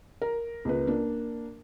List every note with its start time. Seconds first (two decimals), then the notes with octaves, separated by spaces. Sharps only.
0.22 A#4
0.65 C#2 A#3 B4
0.87 A#3 D4